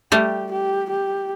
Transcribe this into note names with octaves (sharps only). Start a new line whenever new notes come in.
G3 A3 G4
G4
G4